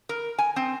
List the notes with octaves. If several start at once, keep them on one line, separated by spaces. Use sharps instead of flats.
A#4
G#5
C4